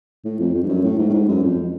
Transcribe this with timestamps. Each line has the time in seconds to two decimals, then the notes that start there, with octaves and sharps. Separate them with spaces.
0.25 A2
0.40 F2
0.54 F2
0.63 G2
0.69 F#2
0.84 A2
0.99 G#2
1.09 A2
1.13 G#2
1.28 F#2
1.43 F2